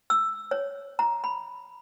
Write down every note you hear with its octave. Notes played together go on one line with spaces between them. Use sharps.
E6
C#5
A#5
B5